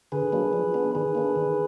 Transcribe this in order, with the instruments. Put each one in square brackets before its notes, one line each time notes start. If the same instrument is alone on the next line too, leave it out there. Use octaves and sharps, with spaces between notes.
[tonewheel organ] D3 G#4 B4
F#3 A#3 D4
F3
B3 D4
D#3 G#4 B4
A#3 D4
D#3